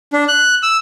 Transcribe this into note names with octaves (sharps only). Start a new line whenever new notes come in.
D4
F#6
E6